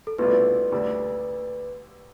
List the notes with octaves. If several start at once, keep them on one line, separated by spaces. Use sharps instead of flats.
A4
C2 B2 A3 D4 F4 B4
D2 D3 G3 D4 A4